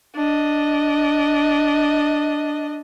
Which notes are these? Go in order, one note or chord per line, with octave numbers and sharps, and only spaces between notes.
D4 D#5